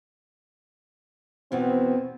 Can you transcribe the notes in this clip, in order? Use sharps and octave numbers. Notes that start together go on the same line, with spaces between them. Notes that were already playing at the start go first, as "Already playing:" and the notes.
E2 B2 C4 F#5